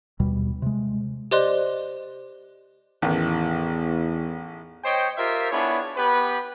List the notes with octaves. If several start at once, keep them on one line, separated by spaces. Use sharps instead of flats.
D#2 B2 G3
C3 G#3
G4 C5 D5 D#5 C6 F#6
A1 E2 D#3
C5 C#5 D#5 G5
F4 G4 A#4 C5 E5
B3 D4 E4 G#4 C#5
B3 G4 B4